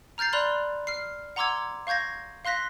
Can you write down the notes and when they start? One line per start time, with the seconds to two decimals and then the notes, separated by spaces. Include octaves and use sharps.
0.18 A#5 F6 G6 A6 C7
0.33 D5 B5 C6 F#6 F7 F#7
0.87 F6 C7
1.36 F#5 A#5 C6 D6 E6 G#6
1.87 F5 C#6 G6 G#6 A#6
2.45 F5 C6 F#6 A#6 B6